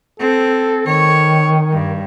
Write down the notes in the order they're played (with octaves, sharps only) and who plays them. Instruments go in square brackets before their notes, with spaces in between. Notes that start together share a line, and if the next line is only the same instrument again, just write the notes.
[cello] C4 [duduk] A4
[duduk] D#3 [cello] C#5
[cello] G2